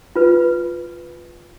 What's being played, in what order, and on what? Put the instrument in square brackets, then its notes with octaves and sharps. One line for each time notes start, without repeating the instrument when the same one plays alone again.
[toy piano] F4 B4